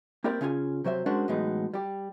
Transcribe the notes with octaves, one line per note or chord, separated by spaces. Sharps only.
A#3 C4 E4 G4 A#4 D5
C#3 C#4 F4 G#5
C3 F#3 C5 E5
G#3 C#4 D4 F#4 A#4 C5
A2 E3 F#3 G#3 B3 D#4
G3 G4